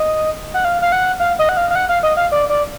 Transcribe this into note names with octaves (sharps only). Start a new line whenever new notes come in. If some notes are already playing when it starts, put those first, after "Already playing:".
Already playing: D#5
F#5
F5
F5
F#5
F5
D#5
F#5
F5
F5
F#5
F5
D#5
F5
D5
D5